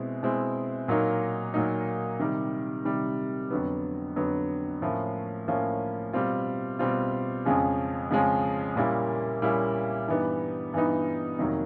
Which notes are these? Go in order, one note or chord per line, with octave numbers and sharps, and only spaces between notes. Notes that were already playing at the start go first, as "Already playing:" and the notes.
Already playing: B2 G#3 C4 E4
B2 G#3 C4 E4
A#2 F#3 A#3 D#4
A#2 F#3 A#3 D#4
C3 D#3 G3
C3 D#3 G3
F2 D3 F#3 B3
F2 D3 F#3 B3
A2 F3 A#3 C#4
A2 F3 A#3 C#4
B2 G3 C4 F4
B2 G3 C4 F4
F2 C#3 F3 G#3 C#4
F2 C#3 F3 G#3 C#4
A#2 G3 A#3 C#4 E4
A#2 G3 A#3 C#4 E4
G2 E3 G3 B3 D#4
G2 E3 G3 B3 D#4
F2 C3 D#3 F#3 A#3